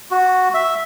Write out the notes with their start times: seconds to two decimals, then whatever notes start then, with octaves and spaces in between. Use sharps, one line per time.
0.11 F#4
0.54 E5